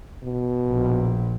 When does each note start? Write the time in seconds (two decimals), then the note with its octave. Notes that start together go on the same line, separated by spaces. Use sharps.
0.24 B2
0.67 A#1